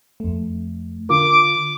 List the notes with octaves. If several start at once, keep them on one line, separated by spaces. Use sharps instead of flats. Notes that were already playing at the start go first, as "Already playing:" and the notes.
F2 A3
D3 F4 A#4 D6